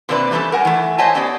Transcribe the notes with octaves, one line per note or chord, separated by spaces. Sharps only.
C3 A#3 C4 D4 B4 D5
E3 G3 A3 C4 C#4 A4
A#4 F#5 G#5
E3 A3
C5 C#5 D#5 E5 G#5 A5
B3 C#4 G4 D5